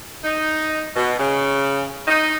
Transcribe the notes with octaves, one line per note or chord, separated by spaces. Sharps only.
D#4
B2
C#3
D#4